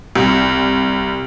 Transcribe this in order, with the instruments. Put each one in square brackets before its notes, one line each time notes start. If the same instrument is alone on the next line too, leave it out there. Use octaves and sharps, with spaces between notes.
[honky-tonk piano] C2